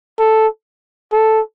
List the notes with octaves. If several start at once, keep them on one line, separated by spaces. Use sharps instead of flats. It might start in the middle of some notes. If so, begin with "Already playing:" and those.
A4
A4